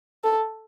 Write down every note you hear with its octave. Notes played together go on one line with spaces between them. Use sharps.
A4